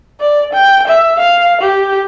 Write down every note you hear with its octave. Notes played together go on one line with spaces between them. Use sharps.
D5
G5
E5
F5
G4